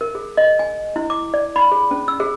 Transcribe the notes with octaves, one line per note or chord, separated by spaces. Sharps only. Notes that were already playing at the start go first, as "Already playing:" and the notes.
A#4
G#4
D#5
G#5
E4
D6
D5
B5
G#4
C#4
E6
G#4